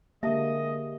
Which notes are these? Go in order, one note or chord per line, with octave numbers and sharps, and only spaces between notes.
D3 G#3 A#3 G4 D#5 E5 A5